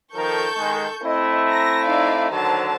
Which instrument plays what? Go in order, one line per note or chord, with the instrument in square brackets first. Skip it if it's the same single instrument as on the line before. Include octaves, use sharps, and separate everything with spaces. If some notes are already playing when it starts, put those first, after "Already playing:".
[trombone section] D#3 F3 A#4 [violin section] A4 C#6 G6
[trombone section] D#3 G#3
[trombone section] A3 C4 E4 [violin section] D#5
[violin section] A#5 A#6
D#4 D5 F5
[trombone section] D3 D#3 F#3 [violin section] C5 A5